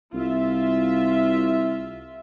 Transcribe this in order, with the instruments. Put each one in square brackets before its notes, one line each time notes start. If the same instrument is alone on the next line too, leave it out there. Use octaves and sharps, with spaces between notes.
[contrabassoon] C2 [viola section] F4 E5